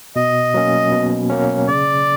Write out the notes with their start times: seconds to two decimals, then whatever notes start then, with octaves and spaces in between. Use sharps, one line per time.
0.16 B2 D#5
0.54 F#3 A#3 C#4
0.92 B2
1.30 F#3 A#3 C#4
1.68 C#3 D5